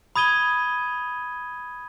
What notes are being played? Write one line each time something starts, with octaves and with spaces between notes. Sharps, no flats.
B5 D#6 G#6 D#7 G7